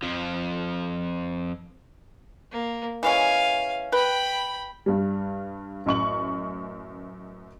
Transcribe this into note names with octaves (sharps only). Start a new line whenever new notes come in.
F2 F3
A#3
E3 G#3 C#4 F5 G#5
B4 G5 B5
G2 G3
A1 F#2 C#6 F#7